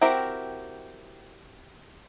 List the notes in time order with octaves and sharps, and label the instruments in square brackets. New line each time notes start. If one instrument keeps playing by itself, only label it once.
[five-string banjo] C4 E4 F#4 G4 A#4